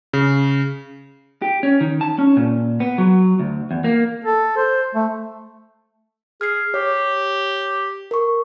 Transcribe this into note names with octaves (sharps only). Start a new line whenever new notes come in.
C#3
G4
C#4
D#3
A5
C#4
A#2
B3
F#3
D2
E2
A#3
A4
C5
A3
G#4 F6 C7
G4 C#5
A#4 C#6